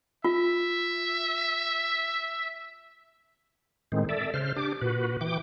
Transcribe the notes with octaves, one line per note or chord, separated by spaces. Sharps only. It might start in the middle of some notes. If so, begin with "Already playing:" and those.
F4 E5
A2 D#3 G#3 C4
A4 D5 E5
C#3 C5 F6
D4 G4 D6
A#2 F#4 B4
E3 G5 D6